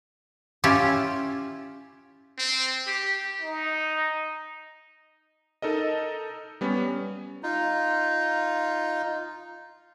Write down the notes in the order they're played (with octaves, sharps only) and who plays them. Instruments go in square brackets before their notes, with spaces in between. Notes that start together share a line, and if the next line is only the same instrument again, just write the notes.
[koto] C#4 E4 F4 G4
[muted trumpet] C4
G4
D#4
[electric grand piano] D#4 A4 A#4 D#5
G3 B3 C#4
[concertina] D#4 F4